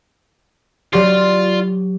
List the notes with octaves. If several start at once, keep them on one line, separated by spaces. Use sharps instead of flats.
F#3 F4 G4 D5